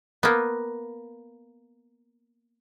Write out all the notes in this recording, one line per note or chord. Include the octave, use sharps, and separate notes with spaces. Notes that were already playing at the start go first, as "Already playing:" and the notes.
A#3 B3